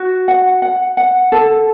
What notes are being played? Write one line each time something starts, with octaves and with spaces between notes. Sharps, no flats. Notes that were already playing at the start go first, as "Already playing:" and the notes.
Already playing: F#4
F#5
F#5
F#5
A4